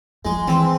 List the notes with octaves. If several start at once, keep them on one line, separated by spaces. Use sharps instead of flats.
F3 G#3
E3 C4